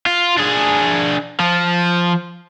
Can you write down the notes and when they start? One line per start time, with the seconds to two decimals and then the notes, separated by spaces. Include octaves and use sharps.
0.06 F4
0.38 D4 G#4
1.40 F3